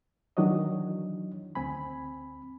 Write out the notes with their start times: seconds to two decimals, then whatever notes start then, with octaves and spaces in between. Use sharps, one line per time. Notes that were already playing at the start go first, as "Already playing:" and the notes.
0.37 D#3 E3 F#3 D4 C#5 D#5
1.55 D2 C4 G#5 B5